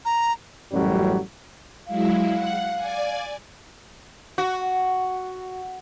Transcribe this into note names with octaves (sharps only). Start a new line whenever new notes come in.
A#5
A1 F#2 F#3 G3
F#3 G#3 E4 F5
F#5
D5 G#5
F#4